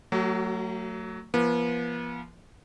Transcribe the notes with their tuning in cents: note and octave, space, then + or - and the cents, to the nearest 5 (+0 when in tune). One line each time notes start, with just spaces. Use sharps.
F#3 +5 A3 +40 F#4 +45
F3 -30 B3 -45